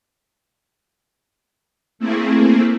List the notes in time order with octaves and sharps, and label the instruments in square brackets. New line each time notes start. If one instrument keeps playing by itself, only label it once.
[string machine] A3 A#3 C4 E4 G#4